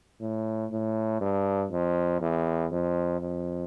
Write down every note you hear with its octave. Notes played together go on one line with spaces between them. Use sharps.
A2
A2
G2
F2
E2
F2
F2